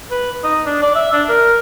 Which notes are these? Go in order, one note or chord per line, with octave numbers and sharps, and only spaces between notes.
B4
D#4
D4
D5
E5
D4
A#4